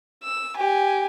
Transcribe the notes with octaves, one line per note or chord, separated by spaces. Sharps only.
E6
G4 G#5